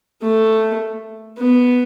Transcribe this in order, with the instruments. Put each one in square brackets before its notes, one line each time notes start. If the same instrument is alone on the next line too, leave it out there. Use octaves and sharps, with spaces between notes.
[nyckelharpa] A3
B3